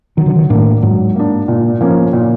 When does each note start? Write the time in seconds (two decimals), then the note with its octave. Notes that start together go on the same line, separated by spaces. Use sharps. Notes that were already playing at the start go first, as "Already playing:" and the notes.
0.17 D#3 F#3
0.26 D3
0.36 D#3
0.50 A2 A#3 D4
0.82 G#2 F#3
1.15 A#3 D4
1.48 A#2
1.81 F3 A#3 C#4
2.13 A#2